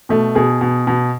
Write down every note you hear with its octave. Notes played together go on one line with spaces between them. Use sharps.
B2 A3
B2 G#4
B2
B2